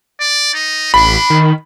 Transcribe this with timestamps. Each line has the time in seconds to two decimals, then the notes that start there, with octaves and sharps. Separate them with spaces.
0.20 D5
0.54 D#4
0.94 A1 D4 B5
1.30 D#3